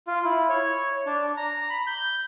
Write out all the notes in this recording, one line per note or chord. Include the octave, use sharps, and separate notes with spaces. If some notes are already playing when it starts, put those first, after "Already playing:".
F4
E4
C#5
D4
A#5
B5
G6